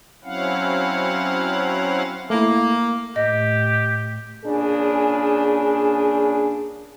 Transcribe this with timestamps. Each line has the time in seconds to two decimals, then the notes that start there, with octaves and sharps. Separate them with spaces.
0.24 F#3 C4 C#4 E4 F5 F#5
2.30 A3 A#3 E4
3.16 A2 G4 D#5
4.44 A#2 C#3 D4 G#4